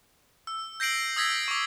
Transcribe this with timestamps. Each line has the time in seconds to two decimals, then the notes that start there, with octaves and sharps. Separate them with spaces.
0.47 E6
0.80 G6 A#6 C7 D7 F#7
1.17 D#6 E6 G#6 A#6 B6
1.48 C#6 D6